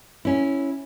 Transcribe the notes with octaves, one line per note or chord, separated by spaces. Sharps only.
C#4 E4